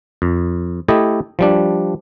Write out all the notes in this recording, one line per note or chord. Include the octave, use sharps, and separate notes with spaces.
F2
A3 E4 G4 A4 D#5
F3 G3 D4